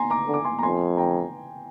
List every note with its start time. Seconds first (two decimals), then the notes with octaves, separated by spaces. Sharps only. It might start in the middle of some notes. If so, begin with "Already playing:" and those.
Already playing: G#5 A#5 C6
0.10 A#5 D6
0.28 D3
0.34 D6
0.45 G#5 C6
0.59 A#5
0.62 F2 G#5 C6
0.97 G5 A#5